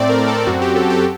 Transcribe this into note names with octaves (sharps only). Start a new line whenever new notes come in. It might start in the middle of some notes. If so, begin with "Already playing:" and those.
Already playing: A2 A3 C4 D5
A#4
A4
F#2 F#3 C4 F#4
G4
A4
G4